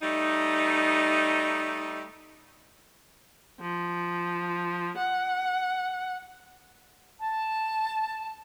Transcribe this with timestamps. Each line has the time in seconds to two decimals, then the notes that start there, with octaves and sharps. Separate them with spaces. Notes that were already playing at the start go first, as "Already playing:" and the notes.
0.02 G3 A3 D#4
3.61 F3
4.98 F#5
7.20 A5